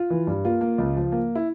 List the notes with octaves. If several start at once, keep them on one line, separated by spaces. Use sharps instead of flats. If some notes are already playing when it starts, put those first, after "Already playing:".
Already playing: F4
E3
G2
A#3 F4
A#3
C#2
F3
A#3
E4